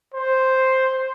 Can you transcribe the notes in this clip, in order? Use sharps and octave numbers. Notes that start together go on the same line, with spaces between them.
C5